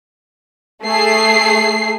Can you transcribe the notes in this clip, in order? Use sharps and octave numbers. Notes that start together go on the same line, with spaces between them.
A3 G#4 C7